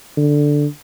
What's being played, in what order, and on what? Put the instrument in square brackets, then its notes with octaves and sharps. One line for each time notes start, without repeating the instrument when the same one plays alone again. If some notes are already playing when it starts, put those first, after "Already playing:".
[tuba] D3